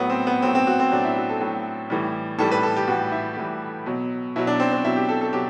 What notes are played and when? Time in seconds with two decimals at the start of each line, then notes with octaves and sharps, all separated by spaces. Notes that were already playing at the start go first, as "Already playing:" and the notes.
Already playing: A2 F#3 B3
0.10 C4
0.27 B3
0.42 A2 F#3 C4
0.55 C4
0.67 F#4
0.80 C4
0.91 A2 F#3 D4
1.05 E4
1.17 F#4
1.29 A4
1.41 A2 F#3
1.90 A2 E3 G3
2.39 A2 E3 G3 A4
2.51 B4
2.63 A4
2.77 G4
2.88 A2 E3 G3 F#4
3.12 E4
3.37 A2 E3 G3
3.86 B2 F#3
4.36 B2 F#3 E4
4.47 D4
4.60 C4
4.73 C4
4.84 B2 F#3 E4
4.96 G4
5.09 A4
5.21 A4
5.33 B2 F#3 G4